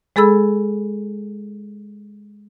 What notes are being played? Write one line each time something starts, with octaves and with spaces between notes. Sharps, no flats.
G#3 G#4 A4 B5 E6